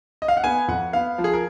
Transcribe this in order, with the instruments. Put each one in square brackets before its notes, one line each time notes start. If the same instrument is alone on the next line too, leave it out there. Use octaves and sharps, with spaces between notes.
[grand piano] D#5
F5
F#5
B3 G#5
F2 F#5
B3 F5
F3
G#4
A#4